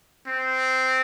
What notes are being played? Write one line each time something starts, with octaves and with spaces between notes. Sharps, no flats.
C4